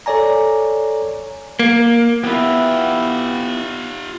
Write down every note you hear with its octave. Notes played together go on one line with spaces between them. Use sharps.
A4 C#5 D5 G#5 A#5
A#3
B3 E4 F4 G4